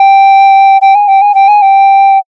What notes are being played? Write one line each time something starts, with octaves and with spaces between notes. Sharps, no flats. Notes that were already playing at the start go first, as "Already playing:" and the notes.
Already playing: G5
G5
G#5
G5
G#5
G5
G#5
G5